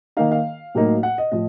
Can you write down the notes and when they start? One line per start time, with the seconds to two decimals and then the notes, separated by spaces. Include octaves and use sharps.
0.17 D#3 A#3 D#4 F5
0.31 F5
0.75 A2 F#3 A#3 D#4
1.03 F#5
1.18 D#5
1.32 A2 F3 D#5